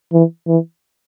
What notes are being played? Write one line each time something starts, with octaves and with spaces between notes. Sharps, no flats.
E3
E3